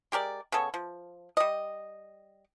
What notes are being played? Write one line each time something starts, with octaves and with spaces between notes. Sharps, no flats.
G#3 G4 A#4 D5
C#3 B3 A4 C#5
F3
G3 D#5